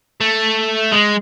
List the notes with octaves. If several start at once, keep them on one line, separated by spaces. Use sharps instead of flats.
A3
G#3